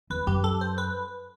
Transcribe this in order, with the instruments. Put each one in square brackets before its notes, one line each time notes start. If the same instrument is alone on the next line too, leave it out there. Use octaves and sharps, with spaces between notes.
[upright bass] E2 [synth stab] B4
[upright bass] F#2 [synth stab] G4
[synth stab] A4
C5
B4